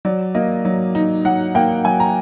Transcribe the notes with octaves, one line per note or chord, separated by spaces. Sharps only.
F#3 D5
A#3 D#5
F#3
D#4
F#3 F#5
A#3 G5
F#3 G#5
A#5